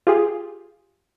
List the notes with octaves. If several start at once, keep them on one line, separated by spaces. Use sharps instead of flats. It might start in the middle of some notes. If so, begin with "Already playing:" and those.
F4 G4 G#4